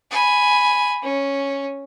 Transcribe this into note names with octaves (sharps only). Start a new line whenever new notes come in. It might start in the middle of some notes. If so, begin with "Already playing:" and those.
G#5 B5
C#4